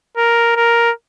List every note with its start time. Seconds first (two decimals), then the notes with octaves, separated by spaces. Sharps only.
0.17 A#4
0.56 A#4